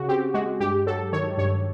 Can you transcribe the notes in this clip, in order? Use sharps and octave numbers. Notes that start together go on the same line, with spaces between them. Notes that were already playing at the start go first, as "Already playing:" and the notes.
Already playing: C#3 F#4
C4 G4
G#3 F#4
G2 G4
F#3 A4
D#3 C#5
G2 C#5